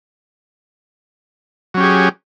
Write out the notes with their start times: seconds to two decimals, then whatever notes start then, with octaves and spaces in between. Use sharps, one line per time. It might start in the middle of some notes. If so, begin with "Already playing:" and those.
1.74 F#3
1.77 C#4
1.80 G4
1.83 G#4